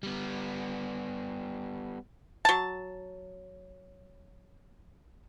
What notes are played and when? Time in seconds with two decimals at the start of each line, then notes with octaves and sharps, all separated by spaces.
0.03 G3 B3
2.45 F#3 A5